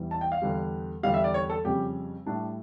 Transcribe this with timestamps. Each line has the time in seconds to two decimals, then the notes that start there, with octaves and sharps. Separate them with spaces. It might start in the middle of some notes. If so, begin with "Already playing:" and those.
Already playing: E2 E3 G3
0.11 A5
0.21 G5
0.32 F5
0.42 E2 D3 G3
1.03 E2 D3 G3 F5
1.14 E5
1.24 D5
1.34 C#5
1.50 A4
1.65 F2 C#3 G3 G4
2.26 A2 G3 D4